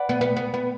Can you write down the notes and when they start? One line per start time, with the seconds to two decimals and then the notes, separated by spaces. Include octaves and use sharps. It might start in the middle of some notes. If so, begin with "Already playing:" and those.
Already playing: B4 D5 F#5 B5
0.09 B3
0.21 B3
0.36 B3
0.54 B3